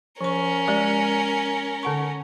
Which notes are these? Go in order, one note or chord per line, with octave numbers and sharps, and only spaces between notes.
F3 C#4 A#4 C#6
G#3 G4 D5
D3 F#5 C#6